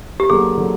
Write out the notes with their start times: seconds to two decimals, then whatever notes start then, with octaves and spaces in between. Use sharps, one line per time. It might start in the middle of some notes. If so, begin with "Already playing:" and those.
0.20 G4
0.30 D3 F#3 A#3 G#4
0.57 D3 F#3